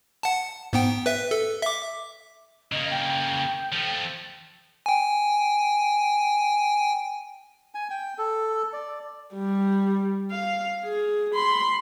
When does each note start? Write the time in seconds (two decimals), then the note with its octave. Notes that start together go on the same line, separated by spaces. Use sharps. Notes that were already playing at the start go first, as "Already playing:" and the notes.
0.23 F#5 A5
0.73 G#2 B3 G5
1.06 B4 E5
1.31 A4
1.62 E5 D6
2.72 C#3 A#3 D#5
2.91 G5
3.72 F3 A3
4.86 G5 G#5
7.75 G#5
7.90 G5
8.18 A4
8.73 D5
9.34 G3
10.31 F5
10.84 G#4
11.35 B5 C6